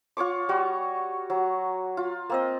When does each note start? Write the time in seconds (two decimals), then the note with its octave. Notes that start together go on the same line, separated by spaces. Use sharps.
0.17 F4 C#5 C#6 D6
0.49 G3 F#4
1.30 F#3
1.97 F4
2.30 A#3 C4 D#5